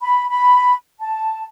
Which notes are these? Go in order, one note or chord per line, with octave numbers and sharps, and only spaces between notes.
B5
B5
A5